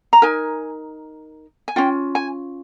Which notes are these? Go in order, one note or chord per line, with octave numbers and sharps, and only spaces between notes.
A#5
D#4 A#4 G#5
G#5
C#4 F4 G5
G#5